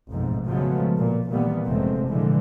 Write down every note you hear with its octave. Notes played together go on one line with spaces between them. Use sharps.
A1 F2 G#2 B2
C#3 F3 F#3 G#3 A3 B3
A#2
A#2 D#3 E3 G3 A#3 B3
F1 F2 C3 G#3 A3 C4
A#2 D3 E3 F3 G#3